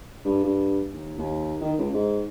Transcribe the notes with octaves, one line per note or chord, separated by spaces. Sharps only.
G2
G2
D#2
D#2
D#3
C#2
G#2